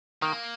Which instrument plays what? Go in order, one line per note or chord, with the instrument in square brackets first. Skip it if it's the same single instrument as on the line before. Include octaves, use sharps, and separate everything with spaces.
[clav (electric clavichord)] D#3 [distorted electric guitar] A#3